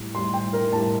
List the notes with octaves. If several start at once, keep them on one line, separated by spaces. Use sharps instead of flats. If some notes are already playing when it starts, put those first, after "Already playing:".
Already playing: A2 G3
A2 G3 C6
G5
A#4
A2 G3 A5